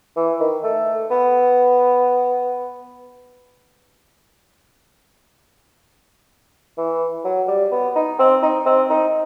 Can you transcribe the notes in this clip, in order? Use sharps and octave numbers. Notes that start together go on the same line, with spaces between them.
E3
D#3
A3
B3
E3
F#3
G3
B3
D#4
C4
D#4
C4
D#4